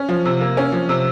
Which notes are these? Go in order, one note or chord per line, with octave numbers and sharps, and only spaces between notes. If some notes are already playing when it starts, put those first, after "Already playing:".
Already playing: C#4
F3
C3
A#3
C#4
F3
C3